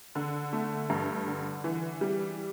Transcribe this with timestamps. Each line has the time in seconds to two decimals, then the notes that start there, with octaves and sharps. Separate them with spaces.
0.15 D3
0.53 A3
0.90 G2
1.27 D3
1.64 E3
2.01 G3